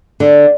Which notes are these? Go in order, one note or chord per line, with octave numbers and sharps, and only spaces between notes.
D3